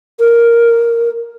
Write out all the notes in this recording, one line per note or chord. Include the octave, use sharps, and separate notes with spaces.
A#4